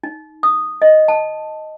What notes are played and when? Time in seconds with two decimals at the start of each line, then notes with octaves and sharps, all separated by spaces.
0.03 D#4
0.43 D#6
0.82 D#5
1.08 A5